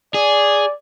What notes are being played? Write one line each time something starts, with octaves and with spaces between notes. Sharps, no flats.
G#4 D5